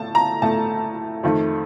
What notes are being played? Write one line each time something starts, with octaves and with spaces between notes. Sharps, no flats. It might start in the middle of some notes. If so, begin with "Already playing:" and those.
Already playing: A2 A3 A5
A#5
A2 A3 A5
F2 D#3 A3